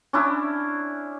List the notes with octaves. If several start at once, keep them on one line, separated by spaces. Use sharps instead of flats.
C#4 D4 E4